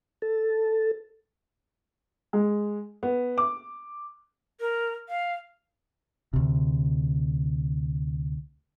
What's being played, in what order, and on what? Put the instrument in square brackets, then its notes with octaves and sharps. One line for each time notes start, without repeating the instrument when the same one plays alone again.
[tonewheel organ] A4
[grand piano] G#3
B3
D6
[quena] A#4
F5
[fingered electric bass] D2 C3